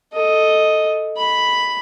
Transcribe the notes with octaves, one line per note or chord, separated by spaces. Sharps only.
A4 D#5
B5